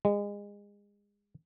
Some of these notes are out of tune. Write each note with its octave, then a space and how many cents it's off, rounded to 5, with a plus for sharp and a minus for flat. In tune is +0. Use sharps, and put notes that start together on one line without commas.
G#3 -30